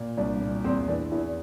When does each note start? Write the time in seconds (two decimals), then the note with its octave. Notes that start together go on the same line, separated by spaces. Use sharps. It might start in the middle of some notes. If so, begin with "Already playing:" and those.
Already playing: A#2
0.17 C2 D4
0.41 A#2
0.64 E2 C4
0.88 E3 D4
1.11 E2 E4